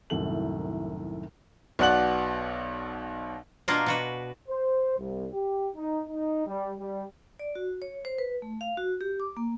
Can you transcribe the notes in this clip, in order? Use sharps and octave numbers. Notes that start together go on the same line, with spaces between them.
C2 F#2 A2 D#3 A4 F#7
B1 B2 D5 F#5 F#6 F#7
B2 A#3 D4 F4 A#4
B2 F#4 B4
C5
C2
G4
D#4
D#4
G3
G3
D5
F#4
C#5
C5
B4
A3
F5
F#4
G4
D6
A#3